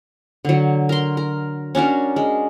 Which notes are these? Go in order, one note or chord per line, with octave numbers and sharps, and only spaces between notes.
D3 F#3
A#4 C6
A#4
C#4 D4 F#4 A#4
G#3